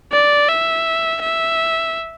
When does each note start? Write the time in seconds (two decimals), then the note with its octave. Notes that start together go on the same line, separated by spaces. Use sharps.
0.13 D5
0.49 E5
1.22 E5